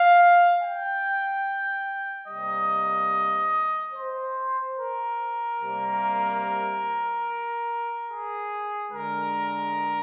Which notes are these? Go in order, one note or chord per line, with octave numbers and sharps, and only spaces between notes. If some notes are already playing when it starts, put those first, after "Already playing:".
Already playing: F5
G5
C3 G3 A#3 D#5
C5
A#4
C3 G3 A#3
G#4
D3 G#3 A#4